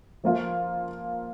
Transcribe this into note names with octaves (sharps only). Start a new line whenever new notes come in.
F3 A#3 F4